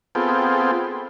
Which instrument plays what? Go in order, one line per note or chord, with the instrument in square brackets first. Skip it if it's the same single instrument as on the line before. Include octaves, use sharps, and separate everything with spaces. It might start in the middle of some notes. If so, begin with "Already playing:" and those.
[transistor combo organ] B3 C4 F4 G#4 A4 G5